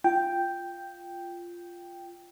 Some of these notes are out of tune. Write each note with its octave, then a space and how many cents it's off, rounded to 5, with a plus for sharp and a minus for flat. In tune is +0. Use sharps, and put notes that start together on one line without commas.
F4 -5 G5 +0